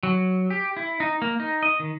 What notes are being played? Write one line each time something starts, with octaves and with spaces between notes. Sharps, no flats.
F#3
G4
E4
D#4
A#3
D#4
D#5
D#3